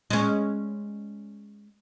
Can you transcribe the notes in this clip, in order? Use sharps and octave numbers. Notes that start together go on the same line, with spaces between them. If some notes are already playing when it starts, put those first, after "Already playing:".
G#3 C#4